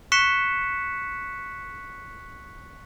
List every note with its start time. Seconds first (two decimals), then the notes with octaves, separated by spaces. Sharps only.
0.12 C#6 F#6 B6 C#7 E7